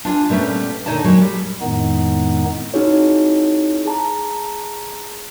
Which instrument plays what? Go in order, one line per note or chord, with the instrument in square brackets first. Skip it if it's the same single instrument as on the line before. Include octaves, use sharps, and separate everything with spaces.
[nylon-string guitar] D4 F4 G#5
A#2 G3 A3 B3 C#4
A#2 D3 D#4 C#5 D5 A5
A#2 F#3 G#3
G3
[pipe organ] F2 A2 D#3 G#3 B3 D#4
[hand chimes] C4 D#4 E4 F#4 G#4 C#5
G#4 A5 A#5